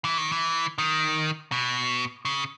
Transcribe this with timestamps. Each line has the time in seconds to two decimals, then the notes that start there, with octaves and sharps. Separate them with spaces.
0.05 E3
0.18 D#3
0.32 E3
0.78 D#3
1.52 B2
2.25 C#3